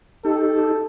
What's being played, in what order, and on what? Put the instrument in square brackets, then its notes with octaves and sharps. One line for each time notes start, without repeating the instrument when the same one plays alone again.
[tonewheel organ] D#4 G4 [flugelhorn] A4